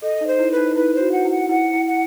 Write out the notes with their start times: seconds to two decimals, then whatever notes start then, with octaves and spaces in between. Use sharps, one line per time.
0.02 A4 D#5
0.21 D#4
0.27 C5
0.39 E4
0.52 B4
0.57 D#4
0.76 E4 B4
0.94 C5
1.00 F#4
1.12 F#5
1.25 E4
1.31 F#5
1.49 E4 F#5
1.74 E4
1.86 F#5